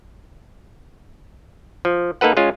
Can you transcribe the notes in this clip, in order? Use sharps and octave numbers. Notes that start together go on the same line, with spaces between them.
F3
A#3 D#4 A4 B4 F#5
G#3 C#4 F4